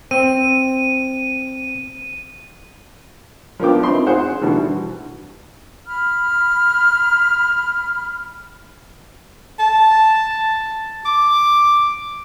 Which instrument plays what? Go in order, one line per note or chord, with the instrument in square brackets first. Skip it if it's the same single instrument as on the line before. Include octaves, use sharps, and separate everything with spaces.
[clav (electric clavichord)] C4 [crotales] D#7
[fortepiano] F3 A#3 B3 D4 G5 D6
C4 D#4 C6
G#4 C5 F#5
B2 D3 E3 G3 B3
[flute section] B5 F6
[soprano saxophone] A5
D6